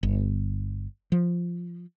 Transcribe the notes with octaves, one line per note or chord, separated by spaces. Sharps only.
G1
F3